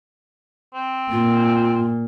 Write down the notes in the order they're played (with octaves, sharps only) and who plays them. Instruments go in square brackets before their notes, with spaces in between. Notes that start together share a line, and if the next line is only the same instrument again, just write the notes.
[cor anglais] C4
[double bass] A#2 [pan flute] F4